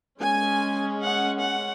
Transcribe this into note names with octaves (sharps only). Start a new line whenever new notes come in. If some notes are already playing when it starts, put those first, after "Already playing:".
G#3 C#4 G#5
F#5
F#5